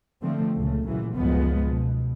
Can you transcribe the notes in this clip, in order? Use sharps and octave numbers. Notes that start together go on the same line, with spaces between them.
D3 F3 A3 C4
C#2 A#2 C#3 A3
A1 A#2 C#3 E3 F#3
C#2 F#2 A2 F3 G#3 B3
B2